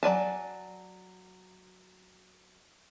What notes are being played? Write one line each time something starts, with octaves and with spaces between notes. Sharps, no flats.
F#3 D5 G#5 A5